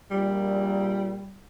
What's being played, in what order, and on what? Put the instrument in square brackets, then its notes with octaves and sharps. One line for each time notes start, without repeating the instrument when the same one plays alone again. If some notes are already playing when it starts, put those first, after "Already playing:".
[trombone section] A#1 A#2 [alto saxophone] G3